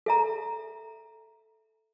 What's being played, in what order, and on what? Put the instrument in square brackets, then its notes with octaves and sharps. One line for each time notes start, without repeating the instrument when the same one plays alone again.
[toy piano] A4 E5 A#5